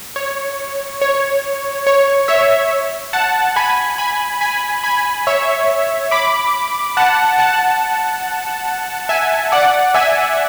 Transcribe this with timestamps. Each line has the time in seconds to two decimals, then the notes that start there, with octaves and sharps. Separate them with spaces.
0.16 C#5
1.02 C#5
1.87 C#5
2.28 C#5 E5
3.13 F#5 A5
3.56 G#5 B5
3.98 G#5 B5
4.41 G#5 B5
4.84 G#5 B5
5.27 C#5 E5
6.11 B5 D6
6.97 F#5 A5
7.39 F#5 A5
9.09 E5 G#5
9.52 D5 F#5
9.94 E5 G#5